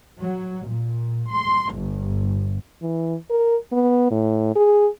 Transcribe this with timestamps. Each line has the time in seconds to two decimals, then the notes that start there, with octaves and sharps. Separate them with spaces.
0.20 F#3
0.67 A#2
1.30 C6
1.74 G1
2.82 E3
3.30 A#4
3.72 B3
4.11 A2
4.56 G#4